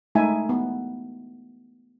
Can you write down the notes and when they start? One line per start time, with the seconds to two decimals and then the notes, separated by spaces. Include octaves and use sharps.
0.15 G#3 A3 D#4 E5 G#5
0.49 B3